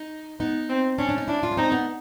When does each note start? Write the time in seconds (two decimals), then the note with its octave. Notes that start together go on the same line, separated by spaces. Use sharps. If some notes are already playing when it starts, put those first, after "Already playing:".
Already playing: D#4
0.40 B3 D#4
0.69 C4
0.98 C#4 D4
1.09 D4
1.18 D#4
1.28 D4 E4
1.43 F4
1.51 C#4
1.57 C4 D#4
1.72 B3